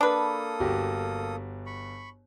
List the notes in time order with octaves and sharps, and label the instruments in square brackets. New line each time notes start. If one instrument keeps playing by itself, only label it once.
[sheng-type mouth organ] A#3 A4 D#6 [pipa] D4 B4
[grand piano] G1 F#4 G4
[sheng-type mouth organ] B5 C#6